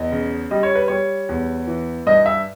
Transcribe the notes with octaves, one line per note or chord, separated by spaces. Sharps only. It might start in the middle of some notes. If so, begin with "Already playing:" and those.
Already playing: E2 D#5
C#3
G3 D#5
C#5
B4
G3 C#5
E2
E3
G2 D#5
E5